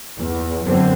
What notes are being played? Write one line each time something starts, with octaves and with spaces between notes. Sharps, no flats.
E2
F#2 D3 C4